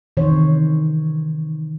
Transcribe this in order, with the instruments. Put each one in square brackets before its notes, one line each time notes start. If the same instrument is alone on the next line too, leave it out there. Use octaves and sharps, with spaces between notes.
[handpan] C3 D#3 E3 C5 C#5